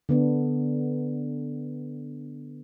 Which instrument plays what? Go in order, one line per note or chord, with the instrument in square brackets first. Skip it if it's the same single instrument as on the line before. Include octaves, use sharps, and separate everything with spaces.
[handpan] D3 B3 D4